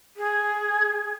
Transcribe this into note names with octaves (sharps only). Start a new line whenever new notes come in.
G#4